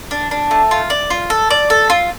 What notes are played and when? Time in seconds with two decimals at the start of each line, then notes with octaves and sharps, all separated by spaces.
0.11 D4
0.31 D4
0.51 A3
0.71 F4
0.90 D5
1.10 F4
1.30 A4
1.50 D5
1.70 A4
1.90 F4